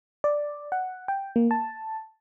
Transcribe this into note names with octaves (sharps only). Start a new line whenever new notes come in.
D5
F#5
G5
A#3
A5